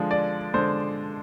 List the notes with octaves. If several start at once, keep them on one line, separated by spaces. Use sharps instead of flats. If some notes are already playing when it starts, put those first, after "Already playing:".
Already playing: D3 F3 G#3
D5
D3 G#3 C5